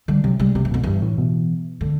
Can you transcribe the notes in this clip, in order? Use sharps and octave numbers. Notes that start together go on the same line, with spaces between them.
D3 G3
C3 F#3
C3 G3
C3 F#3
E3
B2 D3
G2 E3
A2
B2
D3